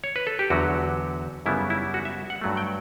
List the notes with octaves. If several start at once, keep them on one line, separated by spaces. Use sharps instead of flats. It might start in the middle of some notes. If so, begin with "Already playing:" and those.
C#5
B4
A4
G4
E2 D3 F#3 F#4
F#2 C#3 G3 B3 E4
E4
F#4
E5
F#5
G2 F#3 A3
G5